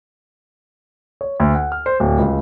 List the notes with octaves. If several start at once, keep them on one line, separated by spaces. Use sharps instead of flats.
C#5
D2
F#5
F6
C5
D1
C#2